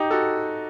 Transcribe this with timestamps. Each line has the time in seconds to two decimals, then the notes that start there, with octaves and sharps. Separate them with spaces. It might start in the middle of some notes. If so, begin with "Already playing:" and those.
Already playing: D#4 G4
0.11 F#4 A4